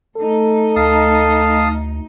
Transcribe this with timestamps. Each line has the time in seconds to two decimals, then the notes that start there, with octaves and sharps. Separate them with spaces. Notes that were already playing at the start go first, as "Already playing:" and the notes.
0.17 A3 D#4 A4
0.76 D2 F5 A5 D#6